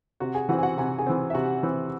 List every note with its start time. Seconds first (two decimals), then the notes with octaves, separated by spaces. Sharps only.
0.20 C3 F#4 F#5
0.35 G#4 G#5
0.49 E3 C4 F#4 F#5
0.59 G#5
0.63 F#4 F#5
0.78 C3 G#5
0.98 G#4 G#5
1.07 E3 C4
1.30 E5
1.34 C3 F#4 F#5
1.63 E3 C4